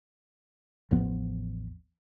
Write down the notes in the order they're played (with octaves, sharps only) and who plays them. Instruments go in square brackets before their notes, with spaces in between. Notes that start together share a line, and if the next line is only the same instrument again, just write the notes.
[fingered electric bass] A1 E2 F3 B3